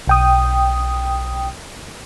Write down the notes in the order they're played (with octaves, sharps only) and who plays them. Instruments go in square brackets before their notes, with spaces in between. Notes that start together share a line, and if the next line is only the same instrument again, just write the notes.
[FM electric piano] B1 G5 D#6